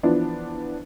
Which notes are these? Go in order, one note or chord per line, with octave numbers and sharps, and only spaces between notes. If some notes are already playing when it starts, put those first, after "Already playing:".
E3 F3 B3 D4